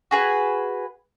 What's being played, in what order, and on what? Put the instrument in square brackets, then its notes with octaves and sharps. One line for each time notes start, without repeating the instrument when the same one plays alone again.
[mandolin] F#4 G#4 B4